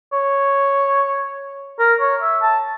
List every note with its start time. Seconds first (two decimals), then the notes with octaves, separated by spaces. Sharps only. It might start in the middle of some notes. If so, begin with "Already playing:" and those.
0.13 C#5
1.79 A#4
2.00 C#5
2.22 E5
2.42 A5